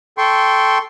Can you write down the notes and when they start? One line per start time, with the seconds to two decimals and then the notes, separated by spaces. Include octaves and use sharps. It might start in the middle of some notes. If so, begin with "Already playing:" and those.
0.18 A4 G5 C6 C#6